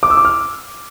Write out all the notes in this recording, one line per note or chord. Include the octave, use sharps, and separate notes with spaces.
D6
E6
D6
F6